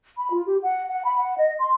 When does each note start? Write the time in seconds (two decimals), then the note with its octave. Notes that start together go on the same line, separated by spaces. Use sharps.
0.17 B5
0.32 F4
0.46 G4
0.62 F#5
0.90 F#5
1.04 B5
1.18 F#5
1.37 D#5
1.58 C6